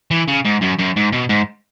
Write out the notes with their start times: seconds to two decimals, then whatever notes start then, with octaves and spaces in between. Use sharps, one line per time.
0.11 E3
0.28 C#3
0.45 G#2
0.61 F#2
0.79 F#2
0.96 G#2
1.12 B2
1.29 G#2